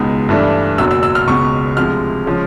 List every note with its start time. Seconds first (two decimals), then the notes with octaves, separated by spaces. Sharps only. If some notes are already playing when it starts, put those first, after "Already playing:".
Already playing: C#2 B2 G#3 B3 D#4
0.29 G2 E3 A3 D4
0.78 F#1 E2 B2 F#3 E6
0.91 E6
1.03 E6
1.15 F6
1.27 C#2 B2 G#3 B3 C#6
1.77 D2 C3 F3 G#3 F6
2.26 C#3 F3 G#3 C#4